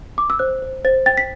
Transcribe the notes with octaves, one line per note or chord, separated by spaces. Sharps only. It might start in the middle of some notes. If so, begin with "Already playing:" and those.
D6
E6
C5 F#6
C5
C5 A6
G5 A6
B6